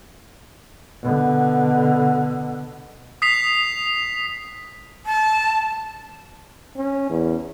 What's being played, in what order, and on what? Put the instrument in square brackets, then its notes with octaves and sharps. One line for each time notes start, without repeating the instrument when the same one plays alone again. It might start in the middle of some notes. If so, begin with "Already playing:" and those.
[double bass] B2 D3
[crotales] D#6 B6 C7 F7
[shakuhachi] A5
[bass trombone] C#4
E2